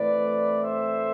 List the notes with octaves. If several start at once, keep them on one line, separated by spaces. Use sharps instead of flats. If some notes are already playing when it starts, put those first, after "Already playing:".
Already playing: A2 E3 A3 C4 B4 D5
C5 E5